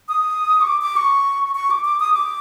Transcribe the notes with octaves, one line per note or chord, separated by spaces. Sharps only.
D#6
C#6
D6
D6
C#6
C#6
D6
D6
D#6
D6